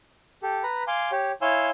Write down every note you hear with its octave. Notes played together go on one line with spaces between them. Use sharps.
G4 A4
B4 A#5 B5
F5 G#5 C6 D6
G4 C#5
E4 C#5 F5 G#5 C6 E6